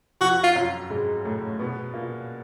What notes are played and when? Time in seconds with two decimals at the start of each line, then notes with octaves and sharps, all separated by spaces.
0.21 F2 F3 F#4
0.44 F4
0.55 F#2 F#3
0.90 G#2 G#3
1.25 A2 A3
1.59 B2 B3
1.94 A#2 A#3